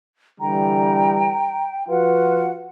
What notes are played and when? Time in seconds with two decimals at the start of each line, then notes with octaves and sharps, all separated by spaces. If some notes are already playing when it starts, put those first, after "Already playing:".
0.40 D3 E3 G3 G5 A#5
1.89 F3 F4 F#4 B4 F#5